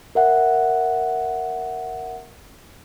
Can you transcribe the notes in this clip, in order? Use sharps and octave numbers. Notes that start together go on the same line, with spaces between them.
A#4 E5 F#5